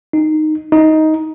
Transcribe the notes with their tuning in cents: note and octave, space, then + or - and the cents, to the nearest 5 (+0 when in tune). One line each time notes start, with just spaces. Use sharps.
D#4 -10
D#4 +10